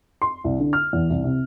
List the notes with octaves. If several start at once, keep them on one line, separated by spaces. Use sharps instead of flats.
C6
C2
D3
F6
E2
C2
C3